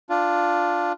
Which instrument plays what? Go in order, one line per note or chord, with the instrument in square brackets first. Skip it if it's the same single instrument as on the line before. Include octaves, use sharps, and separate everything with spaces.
[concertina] D4 F4